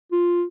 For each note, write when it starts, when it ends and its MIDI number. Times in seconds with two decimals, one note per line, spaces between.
0.12 0.44 65